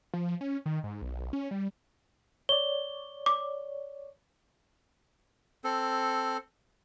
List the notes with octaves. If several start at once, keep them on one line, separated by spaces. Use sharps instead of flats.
F3
C#4
D#3
G#2
B1
C#4
G3
C#5 D5 G7
D6
C4 A4